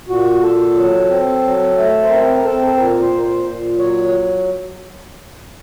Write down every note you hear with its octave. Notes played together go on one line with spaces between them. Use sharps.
A#2 F#4
A#2 A4
F#3
C4
F#3
A3
C5
C4 A#4
C4 A4
A4
A#2 A#4
C5
A#2
A#4
C5
A#2
F#3 C#5